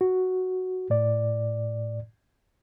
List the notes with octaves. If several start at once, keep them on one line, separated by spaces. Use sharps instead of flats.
F#4
A2 D5